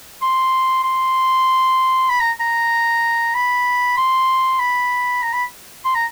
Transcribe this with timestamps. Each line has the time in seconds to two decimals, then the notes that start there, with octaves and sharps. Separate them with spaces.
0.22 C6
0.84 C6
2.09 B5
2.20 A#5
2.40 A#5
3.34 B5
3.97 C6
4.59 B5
5.23 A#5
5.33 B5
5.85 C6
5.95 A#5